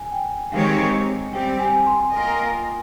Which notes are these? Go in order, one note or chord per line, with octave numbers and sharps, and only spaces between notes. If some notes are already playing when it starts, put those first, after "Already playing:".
Already playing: G#5
G5
D#3 G#3 C4 G4 C#5 F5
G3 C4 G4 G5
G#5
C6
A#3 F4 A#4 D#5